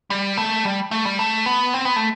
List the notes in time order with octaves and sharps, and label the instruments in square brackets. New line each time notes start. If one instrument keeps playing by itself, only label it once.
[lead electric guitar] G3
A3
G3
A3
G3
A3
B3
C4
B3
A3